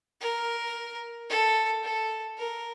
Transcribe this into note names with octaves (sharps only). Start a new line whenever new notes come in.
A#4
A4
A4
A#4